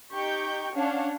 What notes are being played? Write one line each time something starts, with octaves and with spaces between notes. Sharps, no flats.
D#4 G4 G5 C#6 G6
C#4 D4 C#5 F5 F#5 A5